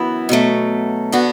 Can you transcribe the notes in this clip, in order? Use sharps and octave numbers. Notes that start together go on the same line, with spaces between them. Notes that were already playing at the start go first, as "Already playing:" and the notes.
Already playing: F#2 E3 B3 E4
B2 F#3 A3
D3 B3 F#4